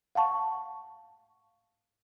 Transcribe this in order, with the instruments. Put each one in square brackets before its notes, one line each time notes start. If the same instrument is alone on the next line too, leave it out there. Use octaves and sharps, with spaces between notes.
[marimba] F5 F#5 A5 C#6